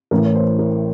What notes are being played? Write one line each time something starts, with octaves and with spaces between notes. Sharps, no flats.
A1 A2 E3 A#4
C#5
C5
A#4